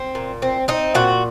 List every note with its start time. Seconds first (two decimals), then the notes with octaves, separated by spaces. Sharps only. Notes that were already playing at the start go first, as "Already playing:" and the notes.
Already playing: C4
0.15 A#2
0.42 C4
0.68 C4 D#4
0.95 A#2 F#4